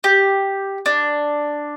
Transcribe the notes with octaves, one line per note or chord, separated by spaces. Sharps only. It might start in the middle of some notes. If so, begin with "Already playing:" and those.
G4
D4